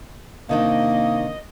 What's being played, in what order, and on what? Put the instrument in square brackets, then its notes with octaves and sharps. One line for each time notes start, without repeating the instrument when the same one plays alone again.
[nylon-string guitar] C3 D#3 D4 [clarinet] A#3 [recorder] D#5